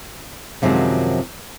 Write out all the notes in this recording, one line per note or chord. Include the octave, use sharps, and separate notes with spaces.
F#2 C3 D#3 F3 F#3 G#3